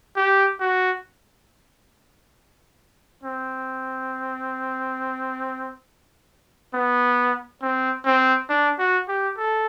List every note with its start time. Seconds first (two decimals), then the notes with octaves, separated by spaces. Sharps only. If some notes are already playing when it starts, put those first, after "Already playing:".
0.17 G4
0.60 F#4
3.23 C4
6.74 B3
7.62 C4
8.05 C4
8.49 D4
8.79 F#4
9.08 G4
9.37 A4